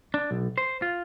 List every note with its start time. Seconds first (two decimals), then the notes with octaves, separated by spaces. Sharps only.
0.14 D4
0.31 B1
0.58 C5
0.82 F4